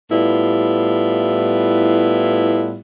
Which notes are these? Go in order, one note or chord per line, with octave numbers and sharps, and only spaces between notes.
A2 G3 B3 E4 F4